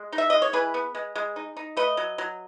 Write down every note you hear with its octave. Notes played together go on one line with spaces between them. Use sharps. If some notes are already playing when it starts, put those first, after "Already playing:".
Already playing: G#3
D#4
E5
G#3 D#5
C#5
E3 G#4 B4
B3
G#3
G#3
D#4
D#4
A3 B4 D#5
F#3
F#3